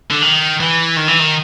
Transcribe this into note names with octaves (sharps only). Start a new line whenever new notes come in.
D3
D#3
E3
D#3
E3
D#3